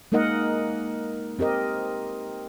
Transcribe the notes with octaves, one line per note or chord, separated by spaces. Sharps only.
G#3 A#3 D#4 A#4 D#5 F#5
C4 G4 A#4 D#5